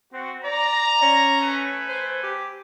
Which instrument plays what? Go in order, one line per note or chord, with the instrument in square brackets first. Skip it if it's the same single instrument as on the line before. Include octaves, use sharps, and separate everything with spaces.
[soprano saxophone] C4 [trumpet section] F#4
[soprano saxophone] D5 [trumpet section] A#5
[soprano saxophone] C#4
[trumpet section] A3 B4 G#5
[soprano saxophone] C5
G4